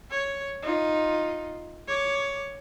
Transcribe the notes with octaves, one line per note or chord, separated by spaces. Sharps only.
C#5
D#4 F4
C#5 D6